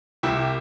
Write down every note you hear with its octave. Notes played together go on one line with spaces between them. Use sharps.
C2 E4 G4